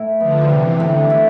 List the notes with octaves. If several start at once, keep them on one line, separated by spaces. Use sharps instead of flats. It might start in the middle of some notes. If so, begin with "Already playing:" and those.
Already playing: A2 E4
D3 F3 B3
C3 E3 G3
A2 D3
E4